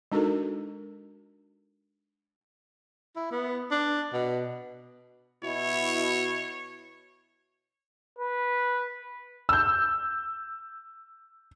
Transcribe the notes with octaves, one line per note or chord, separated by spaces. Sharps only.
G#3 D4 D#4 F#4 A4 A#4
E4
B3
D4
B2
B2 E4 C#5
B4
E6 G6